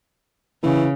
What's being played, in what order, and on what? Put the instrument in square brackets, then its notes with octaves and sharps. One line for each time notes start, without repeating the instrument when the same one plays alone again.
[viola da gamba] C#3 [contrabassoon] E3